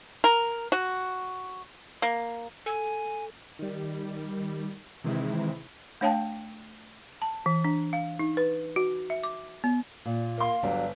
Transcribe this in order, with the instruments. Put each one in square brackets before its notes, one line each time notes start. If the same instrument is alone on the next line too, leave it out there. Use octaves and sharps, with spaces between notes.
[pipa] A#4
F#4
A#3
[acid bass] A4 [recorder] G#5
[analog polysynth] D#3 G3
C3 D#3 E3 G#3 C4 E4
[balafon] A3 D4 C#5 F5 G5 A5
A5
E3
D4
F5
D#4
B4
F#4
E5
D6
B3
[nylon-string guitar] A#2
[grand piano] A#3 C6 [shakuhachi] F5
[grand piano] G1 [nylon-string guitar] F#3 G3 D4